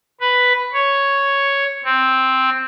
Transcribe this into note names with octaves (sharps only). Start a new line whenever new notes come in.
B4
C#5
C4